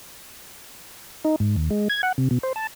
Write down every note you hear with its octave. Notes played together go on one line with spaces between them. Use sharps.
D#4
G#2
D#2
G#3
G#6
F#5
C3
B2
C5
A5